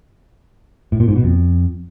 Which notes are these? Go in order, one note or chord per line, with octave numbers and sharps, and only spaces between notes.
A2
A#2
G#2
B2
F2